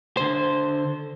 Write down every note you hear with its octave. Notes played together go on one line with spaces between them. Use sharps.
D3 C5